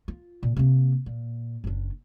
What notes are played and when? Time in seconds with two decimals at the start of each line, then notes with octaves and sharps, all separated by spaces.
0.08 F4
0.43 A#2
0.56 C3 A#3
1.06 A#2
1.64 F#1 D4